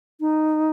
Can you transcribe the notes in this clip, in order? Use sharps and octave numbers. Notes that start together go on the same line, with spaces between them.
D#4